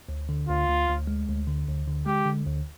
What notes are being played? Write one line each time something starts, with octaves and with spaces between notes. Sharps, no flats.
D2
D3
D2 F4
D2
D2
G#3
D2
D3
D2
D3
G#3 G4
D3
D2